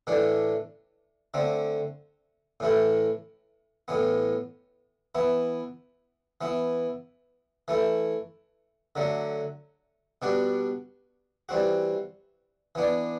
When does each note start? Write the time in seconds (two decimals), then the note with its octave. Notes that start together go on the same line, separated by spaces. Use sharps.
0.07 A2 E3 A3 D4
1.34 D3 A3 C4
2.60 A2 E3 A3 E4
3.88 A2 E3 B3
5.15 E3 B3 E4
6.41 E3 B3 E4
7.68 E3 A3 E4
8.96 D3 F#3 A3
10.22 B2 G3 D4 F#4
11.49 E3 G3 C4 F#4
12.75 E3 B3 D4